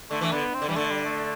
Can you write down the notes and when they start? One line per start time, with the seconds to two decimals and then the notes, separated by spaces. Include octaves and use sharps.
0.11 D3 A3
0.21 E3
0.32 D3 B3
0.54 C4
0.62 D3
0.68 E3 G3
0.75 D3 A3
0.90 G3
1.05 A3